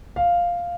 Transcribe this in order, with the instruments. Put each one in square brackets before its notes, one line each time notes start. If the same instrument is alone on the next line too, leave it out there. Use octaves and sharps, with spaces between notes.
[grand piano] F5